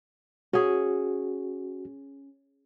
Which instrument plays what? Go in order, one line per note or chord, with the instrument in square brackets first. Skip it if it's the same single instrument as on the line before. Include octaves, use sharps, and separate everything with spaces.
[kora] C#4 G#4 [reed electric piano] F#4